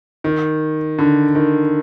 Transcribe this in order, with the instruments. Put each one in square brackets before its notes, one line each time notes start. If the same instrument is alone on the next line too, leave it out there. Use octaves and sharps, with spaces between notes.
[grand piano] D#3
D3
D#3